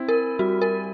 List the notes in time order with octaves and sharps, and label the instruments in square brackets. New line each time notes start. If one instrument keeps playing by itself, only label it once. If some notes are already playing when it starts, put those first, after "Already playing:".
Already playing: [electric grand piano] C4 E4
[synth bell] A#4
[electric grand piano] G3 [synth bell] F#4
[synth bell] A#4